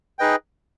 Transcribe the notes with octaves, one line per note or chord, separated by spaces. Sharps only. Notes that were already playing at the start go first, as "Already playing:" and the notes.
D#4 G#4 B4 D#5 G5